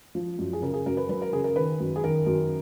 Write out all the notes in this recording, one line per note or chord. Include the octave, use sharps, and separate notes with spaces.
F3
F#2
G#4
C#3 A#4
G#4
F#2 A#4
B4
F#3 B4
A#4
C#3 G#4
A#4
D#3 B4
F#2
G#4
D#3 A#4
F#2